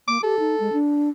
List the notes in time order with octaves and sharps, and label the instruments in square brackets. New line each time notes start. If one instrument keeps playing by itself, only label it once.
[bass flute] A#3 [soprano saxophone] D6
[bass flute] G4 [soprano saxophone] A4
[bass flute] D#4
G#3
D4